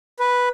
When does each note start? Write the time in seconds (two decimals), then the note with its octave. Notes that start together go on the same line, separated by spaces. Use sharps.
0.19 B4